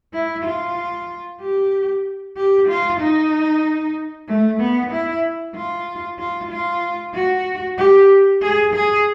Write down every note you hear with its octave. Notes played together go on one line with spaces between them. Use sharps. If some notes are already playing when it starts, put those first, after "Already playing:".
E4
F4
G4
G4
F4
D#4
A3
B3
E4
F4
F4
F4
F#4
G4
G#4
G#4